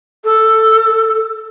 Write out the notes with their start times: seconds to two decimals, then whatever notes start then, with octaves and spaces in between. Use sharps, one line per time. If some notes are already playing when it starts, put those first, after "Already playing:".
0.24 A4